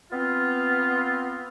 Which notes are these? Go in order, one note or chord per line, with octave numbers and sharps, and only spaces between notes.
B3 C4 F4